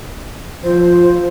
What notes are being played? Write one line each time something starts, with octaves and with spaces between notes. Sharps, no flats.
F3 C5